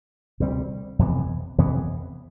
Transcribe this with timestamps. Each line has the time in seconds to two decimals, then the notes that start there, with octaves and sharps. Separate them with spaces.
0.40 D2 C3 G3 C4
0.99 F2 C3 E3 B3
1.58 F2 C3 E3 B3